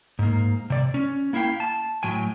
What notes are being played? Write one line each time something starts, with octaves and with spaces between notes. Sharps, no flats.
G#2 A#3
C3 D5
C#4
A#3 E4 E5 F5 G5
A5
A2 F#3 G5 G#5